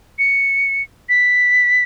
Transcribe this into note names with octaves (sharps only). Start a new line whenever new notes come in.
C#7
B6